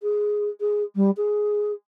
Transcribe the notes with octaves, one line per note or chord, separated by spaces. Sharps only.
G#4
G#4
G3
G#4